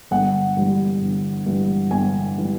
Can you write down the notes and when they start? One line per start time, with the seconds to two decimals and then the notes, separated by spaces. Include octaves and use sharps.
0.11 G1 F#5
0.57 G2 E3 G3
1.01 G1
1.46 G2 E3 G3
1.91 G1 G#5
2.38 E3 G3